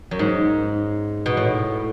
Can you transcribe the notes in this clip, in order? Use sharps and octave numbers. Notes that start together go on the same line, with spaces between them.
F#2
G#2
B2
A2